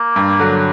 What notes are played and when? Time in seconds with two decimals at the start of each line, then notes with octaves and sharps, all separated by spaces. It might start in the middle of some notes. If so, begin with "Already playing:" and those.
Already playing: A#3
0.16 G2
0.40 D3 F#3